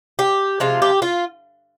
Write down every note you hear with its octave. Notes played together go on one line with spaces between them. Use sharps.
G4
C3 F3 G#3 F4
G4
F4